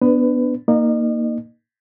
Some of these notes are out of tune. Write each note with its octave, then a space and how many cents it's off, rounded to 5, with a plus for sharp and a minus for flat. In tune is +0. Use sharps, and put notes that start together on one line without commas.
B3 +0 D4 +0 B4 +25
A#3 +0 D#4 +0 D#5 -40